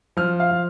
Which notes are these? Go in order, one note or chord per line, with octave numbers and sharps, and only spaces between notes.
F3 F6
F5
F3